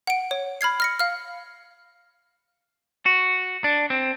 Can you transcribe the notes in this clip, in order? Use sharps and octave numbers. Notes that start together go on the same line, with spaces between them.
F#5 D7
C#5
B5 F6 G#6 C7
F6 A#6 C#7
F5 F6
F#4
D4
C4